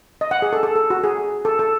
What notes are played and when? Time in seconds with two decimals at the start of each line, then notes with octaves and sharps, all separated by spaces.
0.21 D#5
0.31 F#5
0.42 G#4
0.53 A4
0.63 A4
0.76 A4
0.90 F#4
1.04 G#4
1.45 A4
1.59 A4